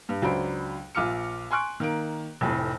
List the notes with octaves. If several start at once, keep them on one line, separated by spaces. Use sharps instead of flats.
G2
C#2 F#3 D4 C5 B5 D7
A#1 F4 D6 F6 C#7
G#5 C6 C#6 F#6 D7
D#3 A#3 D7
F1 F2 A2